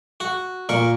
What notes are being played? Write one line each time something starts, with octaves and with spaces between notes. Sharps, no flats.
F#4
A#2 A#4 C#6